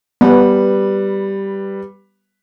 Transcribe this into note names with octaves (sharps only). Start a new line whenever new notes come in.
G3 B3 B4